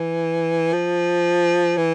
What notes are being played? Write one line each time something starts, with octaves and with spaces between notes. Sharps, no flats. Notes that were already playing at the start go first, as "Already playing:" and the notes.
Already playing: E3
F3
E3